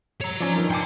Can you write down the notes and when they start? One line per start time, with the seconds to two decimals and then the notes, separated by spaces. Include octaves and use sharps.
0.21 C#5 A#5
0.40 F3 C#4 D5
0.52 G2 D#3
0.71 D4 G5 G#5 C6 D6